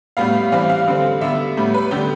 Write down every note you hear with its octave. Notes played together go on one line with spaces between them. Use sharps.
A2 G3 B3 F5
E3 G3 C4 F5
F5
D3 G3 C4
D3 G3 B3 E5
A2 G3 B3
B4
D3 G3 B3 G4